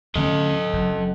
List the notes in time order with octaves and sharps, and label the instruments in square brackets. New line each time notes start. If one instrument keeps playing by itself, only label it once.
[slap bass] D2 D3 C#4 [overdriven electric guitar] A4 D#5
[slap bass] F#1 F#2